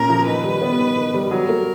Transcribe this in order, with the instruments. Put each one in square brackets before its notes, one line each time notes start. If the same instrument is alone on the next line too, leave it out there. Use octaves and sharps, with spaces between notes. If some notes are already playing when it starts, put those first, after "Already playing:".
Already playing: [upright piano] A#2 C#4 [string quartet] A#4
[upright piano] F3
[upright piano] D#3 [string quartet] B4
[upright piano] G3
B3
D#3
D#3
G3
[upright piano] F#3 [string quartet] A#4
[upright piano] A#3